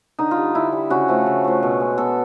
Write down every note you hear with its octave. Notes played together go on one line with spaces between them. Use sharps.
D3 D#4
F4
G3
D3 E4
G3
C#3 F#4
F3 A3
C#3
F3 A3
B2
G#3
B2 A4